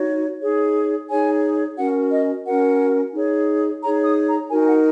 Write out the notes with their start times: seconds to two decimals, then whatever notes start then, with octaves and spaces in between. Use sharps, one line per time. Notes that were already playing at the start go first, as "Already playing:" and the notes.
Already playing: D#4 F#4 C#5
0.40 D#4 G#4 C#5
1.09 D#4 G#4 C#5 G#5
1.77 C#4 F#4 A#4 F#5
2.11 D#5
2.45 C#4 F#4 A#4 F#5
3.14 D#4 G#4 C#5
3.82 D#4 G#4 C#5 A#5
4.05 D#6
4.28 A#5
4.50 D#4 F#4 A#4 G#5
4.60 G#5
4.67 F#5